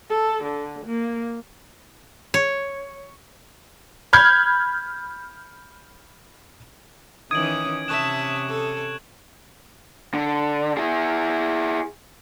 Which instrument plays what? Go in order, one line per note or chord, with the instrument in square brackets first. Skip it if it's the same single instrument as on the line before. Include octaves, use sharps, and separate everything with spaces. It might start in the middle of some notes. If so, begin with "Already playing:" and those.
[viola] A4
D3
A#3
[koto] C#5
[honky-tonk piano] B5 F6 G6 G#6
[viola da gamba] D#3 E3 C#4 [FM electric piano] D#6 [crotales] G#6 D7 F#7
[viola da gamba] C3 C#4 [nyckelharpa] E5 A5 [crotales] C#6 F#6 E7
[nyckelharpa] A4
[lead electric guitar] D3
E4 G#4